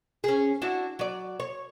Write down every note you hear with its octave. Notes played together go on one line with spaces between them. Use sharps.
C#4 G#4
D4 E4 F#4
F#3 D5
C#5